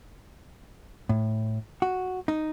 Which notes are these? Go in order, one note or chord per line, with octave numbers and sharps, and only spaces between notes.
A2
F#4
D#4